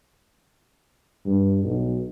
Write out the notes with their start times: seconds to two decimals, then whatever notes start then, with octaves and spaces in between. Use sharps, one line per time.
1.25 G2
1.64 B1